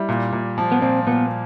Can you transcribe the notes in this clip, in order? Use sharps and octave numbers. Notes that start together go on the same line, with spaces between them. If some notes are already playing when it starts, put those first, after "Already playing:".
Already playing: G3 E4
A#2
A#2
F3
B3
A#2 C4
A#2 B3